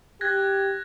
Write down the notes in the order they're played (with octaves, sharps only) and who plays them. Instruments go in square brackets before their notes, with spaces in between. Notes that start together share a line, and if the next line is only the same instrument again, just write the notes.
[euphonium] G4 [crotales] F#6 G#6 A#6